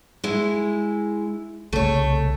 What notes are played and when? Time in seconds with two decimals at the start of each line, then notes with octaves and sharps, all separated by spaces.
0.24 G#3 E4
1.73 C2 C#3 A3 C#5